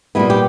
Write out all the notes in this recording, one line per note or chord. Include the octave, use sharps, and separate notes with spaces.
A#2 G3 B3 E4
G4